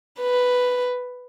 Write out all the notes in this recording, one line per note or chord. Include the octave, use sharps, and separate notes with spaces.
B4